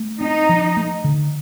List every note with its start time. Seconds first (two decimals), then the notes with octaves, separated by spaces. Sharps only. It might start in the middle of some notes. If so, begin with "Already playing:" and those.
Already playing: A3
0.21 C4 D#4
0.49 F3
0.77 A3
1.04 D3